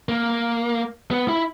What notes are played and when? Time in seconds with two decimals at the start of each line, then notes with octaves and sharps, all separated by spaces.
0.09 A#3
1.11 B3
1.28 E4